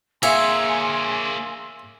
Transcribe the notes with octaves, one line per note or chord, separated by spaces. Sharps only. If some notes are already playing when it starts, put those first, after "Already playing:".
A#3 G#4 C#5 E5 F5 G#5 C6